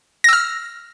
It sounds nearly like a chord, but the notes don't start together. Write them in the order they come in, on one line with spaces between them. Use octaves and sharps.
A#6 E6 F6